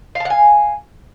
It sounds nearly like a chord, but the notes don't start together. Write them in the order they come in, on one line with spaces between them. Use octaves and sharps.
F5 A5 F#5 G#5